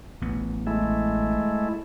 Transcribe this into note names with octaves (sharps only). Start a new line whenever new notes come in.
A1 B3
G#3 A3 E4